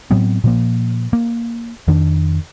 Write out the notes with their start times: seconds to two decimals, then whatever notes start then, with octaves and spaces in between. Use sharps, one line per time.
0.11 A2 F#3 B3 C4
0.44 A#2 F3 A#3
1.13 A#3
1.88 F2 D#3 D4